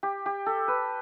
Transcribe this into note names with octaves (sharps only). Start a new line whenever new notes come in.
G4
G4
A4
B4